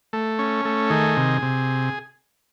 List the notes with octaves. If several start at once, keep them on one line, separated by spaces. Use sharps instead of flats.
A3
C#4
A3
D#3 G#4
C3
C3